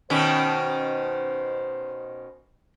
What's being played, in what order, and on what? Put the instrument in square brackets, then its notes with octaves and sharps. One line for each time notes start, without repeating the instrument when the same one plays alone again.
[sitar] B2 D#3 C#4 [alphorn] C5 [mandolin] G5